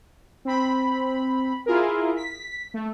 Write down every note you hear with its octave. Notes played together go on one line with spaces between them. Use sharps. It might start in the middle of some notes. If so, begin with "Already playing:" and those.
C4 B5
E4 F4 G#4 A#4
B6
A3